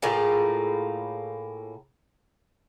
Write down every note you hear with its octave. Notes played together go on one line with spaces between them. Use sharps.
A2 A#3 F4 G#4